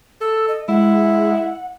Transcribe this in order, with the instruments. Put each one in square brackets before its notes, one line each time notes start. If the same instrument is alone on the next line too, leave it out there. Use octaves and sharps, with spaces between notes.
[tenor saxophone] A4 [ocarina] E6
[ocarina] D#5
[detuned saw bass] G#3 [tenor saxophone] E4 [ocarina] F#5